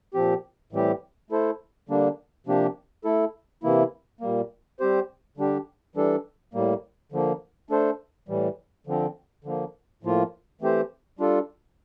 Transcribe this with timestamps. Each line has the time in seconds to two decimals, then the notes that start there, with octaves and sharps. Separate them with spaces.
0.14 A#2 F3 C4 G4
0.72 A2 E3 G3 C4 G4
1.30 A3 E4 A4 C5
1.89 D3 G3 A#3 D4
2.47 C3 F3 A#3 D4 G4
3.04 A3 E4 A4
3.63 C3 E3 A#3 E4
4.20 A#2 G3 A#3
4.80 G3 C4 G4 C5
5.37 D3 G3 D4 G4
5.95 E3 G3 D4 A4
6.54 A2 G3 A#3
7.12 D3 F3 A#3
7.70 A3 D4 A4 C5
8.28 A2 E3 G3
8.87 D3 F3 C4
9.44 D3 F3 A#3
10.03 A2 F3 A#3 F4
10.61 E3 A3 C4 G4 C5
11.19 G3 D4 F4 A4